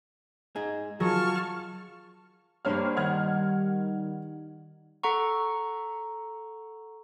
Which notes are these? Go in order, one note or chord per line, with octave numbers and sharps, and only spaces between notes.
G#2 D#4 G#4
F#3 F4 G#4 A#4 A5 C#6 F6
G2 A#3 G4 C5 C#5 F6
D#3 G3 F#5 F6 G#6
A4 F#5 A#5 C#6